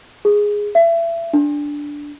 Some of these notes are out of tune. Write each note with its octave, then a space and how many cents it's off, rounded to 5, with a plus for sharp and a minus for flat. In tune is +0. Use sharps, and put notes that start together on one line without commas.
G#4 -5
E5 +30
D4 -5